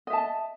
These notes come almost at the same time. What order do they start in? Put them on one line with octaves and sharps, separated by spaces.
D#5 E5 A5